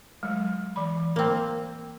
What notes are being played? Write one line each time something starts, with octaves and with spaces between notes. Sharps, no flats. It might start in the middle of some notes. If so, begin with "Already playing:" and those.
F#3 G#3
E3 B5
A#3 C4